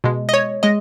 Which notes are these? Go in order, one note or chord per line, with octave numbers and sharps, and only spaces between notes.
B2 G#3
D#5
C#5
G#3 D#5